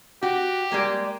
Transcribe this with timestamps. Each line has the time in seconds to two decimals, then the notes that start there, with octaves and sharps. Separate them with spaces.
0.23 F#4 G4
0.72 G3 G#3 A#3